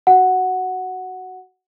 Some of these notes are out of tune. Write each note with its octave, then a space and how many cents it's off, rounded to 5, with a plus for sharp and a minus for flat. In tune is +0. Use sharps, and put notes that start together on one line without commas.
F#4 +10 F#5 +0